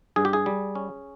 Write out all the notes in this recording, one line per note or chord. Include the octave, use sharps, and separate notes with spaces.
G2 G#4
G4
G#4
G3
C#4